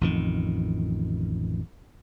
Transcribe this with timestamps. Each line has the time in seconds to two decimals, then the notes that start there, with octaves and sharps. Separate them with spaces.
0.01 A1 F2 D#3